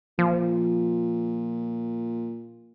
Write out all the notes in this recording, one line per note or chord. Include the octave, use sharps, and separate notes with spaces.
A#2 F3